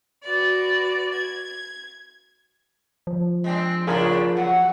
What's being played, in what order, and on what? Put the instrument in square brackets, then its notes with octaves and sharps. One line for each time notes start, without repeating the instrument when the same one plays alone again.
[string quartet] F#4 B4 D5
G#6
[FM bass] F3
[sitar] G#3 C4 D4
[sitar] A2 C#3 D4 [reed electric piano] F4 G#4 A#4
[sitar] F#3 [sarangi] F#5